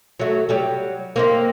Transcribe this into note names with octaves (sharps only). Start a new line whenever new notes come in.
F#3 A3
F#3 G3 G4
A#3 C4 D#4